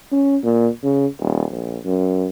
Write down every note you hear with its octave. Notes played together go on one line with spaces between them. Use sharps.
C#4
A#2
C#3
D#1
A#1
F#2